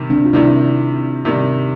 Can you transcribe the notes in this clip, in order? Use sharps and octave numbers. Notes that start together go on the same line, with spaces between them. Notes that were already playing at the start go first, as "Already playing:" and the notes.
Already playing: C3 D#3 G3
C4 D4
F4
C3 D#3 G3 D4 E4
C3 D#3 G3